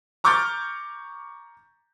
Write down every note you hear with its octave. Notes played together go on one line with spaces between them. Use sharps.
A#5 C#6 D6 F6 G6 A6